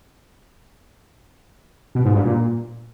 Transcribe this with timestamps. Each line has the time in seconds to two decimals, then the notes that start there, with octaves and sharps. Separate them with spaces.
1.95 B2
2.05 G#2
2.15 G2
2.25 A#2